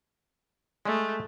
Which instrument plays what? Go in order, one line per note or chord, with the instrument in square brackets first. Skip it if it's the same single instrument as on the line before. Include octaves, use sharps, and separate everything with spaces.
[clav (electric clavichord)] G#3 [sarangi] A3